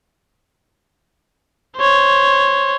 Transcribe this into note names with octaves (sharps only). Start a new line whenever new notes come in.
C5 C#5